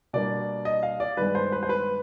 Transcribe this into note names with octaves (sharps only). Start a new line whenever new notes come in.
B2 G3 A#3 D4 D5
D#5
F5
D5
G2 D#3 G#3 B3 B4
C5
B4
C5
B4